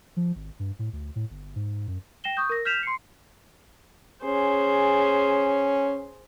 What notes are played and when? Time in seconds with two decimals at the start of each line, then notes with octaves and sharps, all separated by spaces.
0.17 F3
0.36 G#1
0.59 G2
0.79 A2
0.93 D2
1.16 A2
1.30 G1
1.56 G#2
1.88 F#2
2.24 G5 A#6 E7 G7
2.37 C#6 D#6 G6
2.50 A#4 A#6
2.65 F6 G6 B6 E7 F7
2.83 C6 C7 C#7
4.25 C#4 G#4 C5